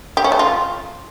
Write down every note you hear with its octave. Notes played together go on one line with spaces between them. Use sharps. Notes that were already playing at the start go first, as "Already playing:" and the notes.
G4
C#4
A3
F4